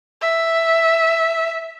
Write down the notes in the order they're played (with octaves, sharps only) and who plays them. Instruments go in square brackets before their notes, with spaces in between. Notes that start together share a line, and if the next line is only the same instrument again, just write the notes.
[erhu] E5